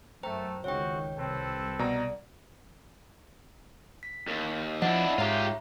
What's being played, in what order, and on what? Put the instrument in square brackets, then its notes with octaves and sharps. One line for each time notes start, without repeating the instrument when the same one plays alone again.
[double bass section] F#2 [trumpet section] A3 [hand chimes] C5 G5 A#5
[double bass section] C#2 D#3 [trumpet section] C4 F#4 [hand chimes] C#5 G5
[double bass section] C2 [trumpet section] C4 A4 B4
[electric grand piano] B2 A#5 [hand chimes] D5
[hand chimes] B6
[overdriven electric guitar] D#2
[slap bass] F3 [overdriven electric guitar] D4 E4 [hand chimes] D#5 F#5
[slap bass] G#2 [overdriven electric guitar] F4 G4 [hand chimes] C#5 E5 A#5